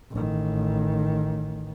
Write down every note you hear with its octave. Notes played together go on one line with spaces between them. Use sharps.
A1 D#3